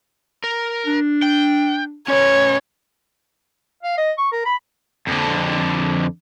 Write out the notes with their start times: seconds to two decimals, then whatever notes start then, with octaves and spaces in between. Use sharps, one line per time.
0.44 A#4
0.86 D4
1.22 G5
2.08 C#4 B4 C#5
3.83 F5
3.97 D#5
4.18 C#6
4.32 A#4
4.45 B5
5.07 F2 D3